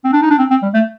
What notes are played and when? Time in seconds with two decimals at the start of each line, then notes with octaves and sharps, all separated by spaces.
0.04 C4
0.13 D4
0.22 D#4
0.30 D4
0.39 C4
0.50 C4
0.63 G3
0.74 A3